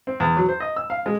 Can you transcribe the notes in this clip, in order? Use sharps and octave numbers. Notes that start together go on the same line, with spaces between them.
C4
E2
F#3
C5
D#5
E6
F5
G#3